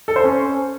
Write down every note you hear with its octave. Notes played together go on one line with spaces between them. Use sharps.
A4
C5
C#4